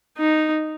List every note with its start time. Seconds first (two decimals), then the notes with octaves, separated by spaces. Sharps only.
0.17 D#4